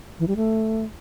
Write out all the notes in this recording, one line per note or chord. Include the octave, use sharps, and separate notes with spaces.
E3
G3
A3